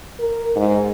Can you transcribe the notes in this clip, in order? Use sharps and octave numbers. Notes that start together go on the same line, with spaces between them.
A#4
G#2